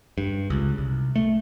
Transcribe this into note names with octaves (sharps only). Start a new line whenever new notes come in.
G2
C#2
C2
A3